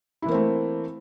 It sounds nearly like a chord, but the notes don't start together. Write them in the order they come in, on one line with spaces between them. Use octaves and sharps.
E4 E3 A#3 C4 A3